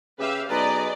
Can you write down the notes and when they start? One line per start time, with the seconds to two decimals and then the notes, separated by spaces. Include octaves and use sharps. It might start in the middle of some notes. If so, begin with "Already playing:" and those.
0.19 C#3 G4 B4 E5 F5
0.50 B1 G#4 B4 D5 D#5 A#5